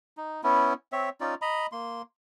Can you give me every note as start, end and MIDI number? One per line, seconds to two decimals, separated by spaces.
0.17 0.41 63
0.43 0.73 59
0.43 0.73 61
0.43 0.73 64
0.92 1.09 60
0.92 1.09 73
0.92 1.09 76
1.20 1.35 61
1.20 1.35 63
1.20 1.35 65
1.20 1.35 74
1.42 1.66 75
1.42 1.66 82
1.42 1.66 83
1.72 2.02 58
1.72 2.02 84